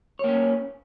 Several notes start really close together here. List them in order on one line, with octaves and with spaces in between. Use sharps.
C#5 A#3 C#4